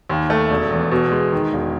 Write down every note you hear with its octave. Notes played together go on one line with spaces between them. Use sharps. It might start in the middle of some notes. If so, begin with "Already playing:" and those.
D#2
A3
E1
E2
B2
G#3
D#3
E1